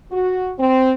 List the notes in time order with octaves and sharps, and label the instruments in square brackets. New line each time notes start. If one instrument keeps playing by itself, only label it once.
[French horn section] F#4
C4